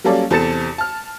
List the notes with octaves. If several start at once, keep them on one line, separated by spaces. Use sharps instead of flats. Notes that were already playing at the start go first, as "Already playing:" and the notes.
F#3 G3 A#3 C#4 A4 D5
E2 C3 A4 A6 C#7 E7
A5 F6